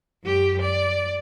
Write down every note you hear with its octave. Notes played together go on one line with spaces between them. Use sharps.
F#2 G4
D5